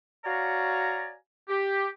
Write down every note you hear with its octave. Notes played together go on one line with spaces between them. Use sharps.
F#4 C#5 D5 F5 G#5 A#5
G4